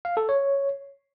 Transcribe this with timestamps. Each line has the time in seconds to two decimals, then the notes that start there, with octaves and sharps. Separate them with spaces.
0.05 F5
0.17 A4
0.29 C#5